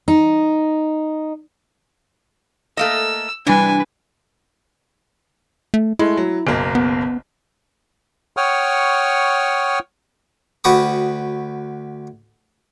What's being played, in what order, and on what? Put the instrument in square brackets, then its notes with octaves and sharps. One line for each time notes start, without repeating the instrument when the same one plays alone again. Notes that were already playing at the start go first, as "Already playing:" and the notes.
[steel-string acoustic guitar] D#4
[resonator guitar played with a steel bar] A3 A#3 D#5 [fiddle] E6
[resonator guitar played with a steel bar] C3 E3 [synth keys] G3 D4 [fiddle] B4 [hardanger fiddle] G#5
[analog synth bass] A3
[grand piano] G#3 A3 [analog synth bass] E4
[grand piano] F#3
F#1 B1 A#3
[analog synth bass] B3
[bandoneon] C#5 F#5 G5 C#6 D#6 F6
[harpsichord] D2 F#4 G4 B4 C#6 D#6